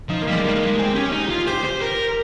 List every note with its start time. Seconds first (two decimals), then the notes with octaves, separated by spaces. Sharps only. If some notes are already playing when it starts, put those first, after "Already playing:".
0.09 F3 D#4
0.22 A#3
0.27 G3
0.33 G#3
0.44 G3 A#3
0.56 G#3
0.67 G#3
0.79 C4 G#4
0.95 C#4 G4
1.12 D#4
1.30 F4
1.48 G4 C5
1.65 C5
1.82 A#4